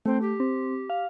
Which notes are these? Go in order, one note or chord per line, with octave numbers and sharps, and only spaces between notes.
A3 C4
G4
C4
F5